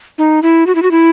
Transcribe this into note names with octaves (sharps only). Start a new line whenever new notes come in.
D#4
E4
F#4
E4
F#4
E4